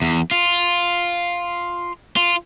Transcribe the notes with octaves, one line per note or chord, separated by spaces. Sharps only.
E2
F4
F4